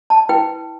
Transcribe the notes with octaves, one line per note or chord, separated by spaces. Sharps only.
A5
E4 B4 G5